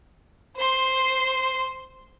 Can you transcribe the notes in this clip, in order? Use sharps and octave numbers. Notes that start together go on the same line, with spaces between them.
C5 C6